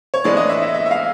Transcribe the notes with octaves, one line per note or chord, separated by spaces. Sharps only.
C#5
A2 E3 G#3 B3 D4 D5
D#5
E5
E5
E5
E5
F5